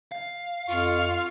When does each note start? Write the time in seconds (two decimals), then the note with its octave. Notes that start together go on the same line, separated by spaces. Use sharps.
0.12 F5
0.68 F2 F4 C#6 F6